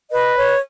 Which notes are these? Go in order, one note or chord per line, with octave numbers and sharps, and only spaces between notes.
B4 D#5
C#5